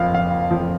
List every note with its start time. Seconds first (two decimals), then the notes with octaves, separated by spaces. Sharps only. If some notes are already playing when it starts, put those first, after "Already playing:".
Already playing: F#1 F2 F3 F5
0.14 F#1 F5
0.50 F2 F3